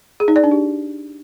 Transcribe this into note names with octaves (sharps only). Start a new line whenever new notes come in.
G#4
D#4
D5
D4
G4